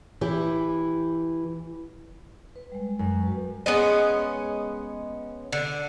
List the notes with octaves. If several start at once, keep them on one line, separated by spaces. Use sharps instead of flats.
E3 E4 G4
B4
G3 G#3
F#2
F#4 B4
G#3 B3 C#4 D#5
D3